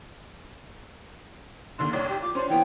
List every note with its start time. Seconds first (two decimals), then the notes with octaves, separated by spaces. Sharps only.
1.79 D#2 D3 C6
1.93 F1 C2 C#5 D5
2.09 G4
2.22 F4 D6
2.35 C#4 D4 C5
2.50 E3 B3 C#4 G5